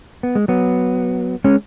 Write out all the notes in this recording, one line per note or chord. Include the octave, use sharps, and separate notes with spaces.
B3
G#3
F#3 B3
G#3 C#4